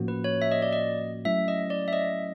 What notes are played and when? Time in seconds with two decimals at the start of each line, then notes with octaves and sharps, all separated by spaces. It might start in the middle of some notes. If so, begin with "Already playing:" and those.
Already playing: A2 F3 A#3 C#4 F#4
0.08 B4
0.24 C#5
0.42 E5
0.52 D#5
0.62 D5
0.73 D#5
1.25 F#3 A3 C#4 E4 E5
1.48 D#5
1.70 D5
1.88 E5
1.93 D#5